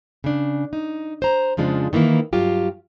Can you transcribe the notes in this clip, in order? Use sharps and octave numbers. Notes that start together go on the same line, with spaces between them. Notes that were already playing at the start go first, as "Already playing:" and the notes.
C#3 D4
D#4
C5 A#5
F2 C#3 F3 G#3 D4
D#3 E3 A#3 E4
G2 F#3 F4 G4